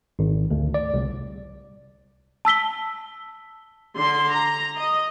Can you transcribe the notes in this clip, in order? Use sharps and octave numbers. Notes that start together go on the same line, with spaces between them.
G#1
D2
D5
C2
A5 E6 B6 G7
D3 C6
A#5
D#5